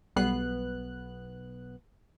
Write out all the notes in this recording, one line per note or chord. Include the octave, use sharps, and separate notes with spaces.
B1 G3 B3 F#6 C7